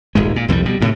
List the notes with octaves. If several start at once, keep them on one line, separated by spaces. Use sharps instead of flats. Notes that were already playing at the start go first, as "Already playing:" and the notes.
D#1 G#1 G#3
A#2
C2 F2 F#3 G3
B2 G3
D2 A2 C3